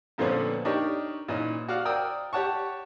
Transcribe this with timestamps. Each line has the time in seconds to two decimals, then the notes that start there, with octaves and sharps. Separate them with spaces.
0.18 F2 A#2 D3 F3 B3 C#4
0.65 D4 D#4 G4 A#4 C#5
1.28 A#2 E3 C#4 D#4
1.68 F#4 D5 F5
1.85 A#4 D5 G5 D#6 E6
2.33 G4 C#5 F#5 A5 C#6